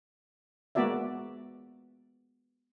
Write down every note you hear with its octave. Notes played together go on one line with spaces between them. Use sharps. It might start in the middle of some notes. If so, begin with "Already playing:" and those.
G#3 A#3 B3 F#4 D5 E5